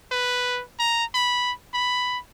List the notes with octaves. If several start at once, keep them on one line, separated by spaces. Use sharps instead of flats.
B4
A#5
B5
B5